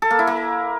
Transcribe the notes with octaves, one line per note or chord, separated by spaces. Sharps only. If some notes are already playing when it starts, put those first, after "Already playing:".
A4
A#3
E4
A#3